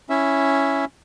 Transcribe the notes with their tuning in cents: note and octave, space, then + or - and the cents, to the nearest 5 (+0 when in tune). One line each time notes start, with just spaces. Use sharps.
C#4 +0 E4 +0 E5 +0